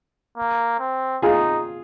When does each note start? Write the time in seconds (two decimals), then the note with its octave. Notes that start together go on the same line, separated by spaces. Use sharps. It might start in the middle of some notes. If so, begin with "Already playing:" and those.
0.37 A#3
0.80 C4
1.22 D#4 F4 G#4